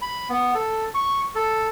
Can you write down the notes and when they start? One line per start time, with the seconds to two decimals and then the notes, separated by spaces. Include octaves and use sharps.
0.02 B5
0.29 B3
0.55 A4
0.95 C#6
1.35 A4